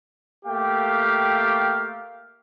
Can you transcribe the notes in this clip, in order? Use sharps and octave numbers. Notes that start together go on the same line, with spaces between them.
A3 A#3 G4 F5 G5